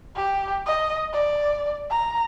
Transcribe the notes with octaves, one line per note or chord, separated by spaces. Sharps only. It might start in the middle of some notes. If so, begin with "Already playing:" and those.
G4
D#5
D5
A#5